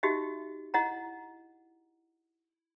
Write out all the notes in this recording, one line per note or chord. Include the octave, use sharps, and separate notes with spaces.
D#4 F#4 G4 D#5 E5
E4 D#5 F#5 A#5